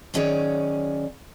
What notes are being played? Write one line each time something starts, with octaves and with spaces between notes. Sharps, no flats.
D#3 F#3 C#4 G#4 C#5 D5